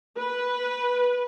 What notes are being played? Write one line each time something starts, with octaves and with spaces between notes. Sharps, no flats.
B4